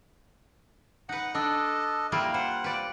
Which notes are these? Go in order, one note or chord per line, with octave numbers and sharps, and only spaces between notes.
D#4 B4 F#5
D4 A4 D#5
G3 A#3 E4 F4
C5 F#5
B4 D5